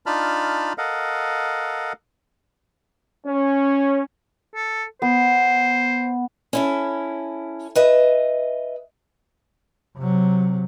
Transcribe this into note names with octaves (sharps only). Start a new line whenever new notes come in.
D4 D#4 F4 A5 B5 F6
A4 A#4 D#5 F5 F#5
C#4
A4
B3 C5
C#4 E4 A4
B4 D#5 E5
C3 F#3